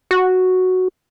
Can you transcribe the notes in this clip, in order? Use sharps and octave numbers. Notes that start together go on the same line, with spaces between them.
F#4